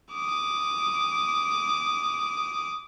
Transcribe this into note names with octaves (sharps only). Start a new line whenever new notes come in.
D6 D#6